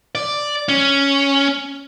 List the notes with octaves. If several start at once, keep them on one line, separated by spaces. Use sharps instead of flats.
D5
C#4